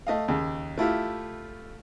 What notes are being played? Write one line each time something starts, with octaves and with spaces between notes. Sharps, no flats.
A3 D#5 F5
D#2 C#3
A3 E4 F4 G4